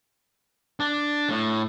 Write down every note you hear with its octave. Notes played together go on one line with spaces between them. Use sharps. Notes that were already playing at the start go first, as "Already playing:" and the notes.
D4
A2